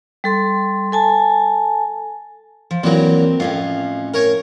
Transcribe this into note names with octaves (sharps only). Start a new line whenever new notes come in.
G3 A4 C6
A4 G#5 A5
F3
A#2 E3 F#3 C4 A#4
F2 A2 C#4 F5
A#4 C#5 G#5